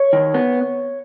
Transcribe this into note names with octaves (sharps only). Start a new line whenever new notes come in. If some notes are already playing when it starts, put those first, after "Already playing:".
Already playing: C#5
D#3
B3